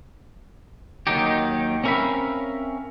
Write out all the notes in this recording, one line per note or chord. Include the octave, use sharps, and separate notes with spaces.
D#2 B2 D#3 F#3 D#4 G4
C4 C#4 A#4 E5 F5 B5